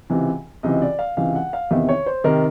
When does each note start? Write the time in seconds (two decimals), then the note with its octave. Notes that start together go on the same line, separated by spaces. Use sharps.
0.10 C#2 C3 E3
0.63 C#2 C3 E3 D#5
0.82 D5
0.99 F5
1.17 C#2 C3 E3 F5
1.35 F#5
1.53 F5
1.71 E2 C3 D#3 E5
1.89 C#5
2.06 C5
2.24 C3 D#3 A#4